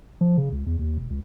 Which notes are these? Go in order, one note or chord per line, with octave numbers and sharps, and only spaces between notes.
F3
C#3
C#2
E2
D#2
E1
C#2